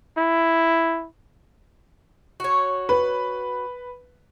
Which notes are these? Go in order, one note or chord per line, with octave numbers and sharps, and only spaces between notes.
E4
F#4 C#5
B4